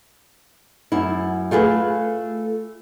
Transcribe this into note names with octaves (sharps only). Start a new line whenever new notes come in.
F#2 E4
A3 F4 G#4 B4